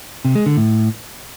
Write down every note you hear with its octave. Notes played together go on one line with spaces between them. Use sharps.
C3
G#3
D3
A2